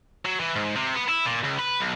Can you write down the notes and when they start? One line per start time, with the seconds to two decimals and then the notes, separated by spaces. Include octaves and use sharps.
0.25 F#3
0.40 E3
0.56 G#2
0.76 C3
0.95 B3
1.08 E4
1.26 A#2
1.43 C#2
1.59 B4
1.81 B1